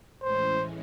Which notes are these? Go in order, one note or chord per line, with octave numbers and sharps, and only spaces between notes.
A2 E3 G#3 C#4 C5